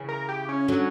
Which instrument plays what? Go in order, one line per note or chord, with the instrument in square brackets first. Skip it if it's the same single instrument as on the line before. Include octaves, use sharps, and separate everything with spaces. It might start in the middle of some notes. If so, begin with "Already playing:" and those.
Already playing: [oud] C#3 E3
[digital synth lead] A#4
G4
C#4
[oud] D3 F#3